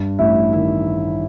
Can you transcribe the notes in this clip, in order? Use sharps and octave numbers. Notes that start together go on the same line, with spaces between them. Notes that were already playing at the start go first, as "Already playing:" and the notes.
Already playing: G2
A1 E4 E5
D#3 E4 E5